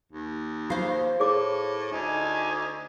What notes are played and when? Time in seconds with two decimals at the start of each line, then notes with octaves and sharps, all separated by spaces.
0.12 D#2
0.70 F4 C5 F5
1.20 A2 G#4 C#5 D6
1.92 D2 D#4 G#5